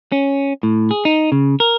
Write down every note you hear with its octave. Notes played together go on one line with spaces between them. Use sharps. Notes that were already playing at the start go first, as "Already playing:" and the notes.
C#4
A2
G#4
D#4
C#3
A#4